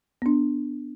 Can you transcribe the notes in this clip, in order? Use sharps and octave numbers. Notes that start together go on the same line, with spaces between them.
B3 D4